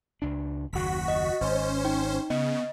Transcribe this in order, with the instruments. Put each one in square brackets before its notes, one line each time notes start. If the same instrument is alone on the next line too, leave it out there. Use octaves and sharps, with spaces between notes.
[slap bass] C#2 D4
[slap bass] F#1 D#2 C#3 [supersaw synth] F#4 B6
[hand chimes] D#5
[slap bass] G#1 [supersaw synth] C#4 C5
[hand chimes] D#4 G5
[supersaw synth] C#3 [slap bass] B3 [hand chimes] D#5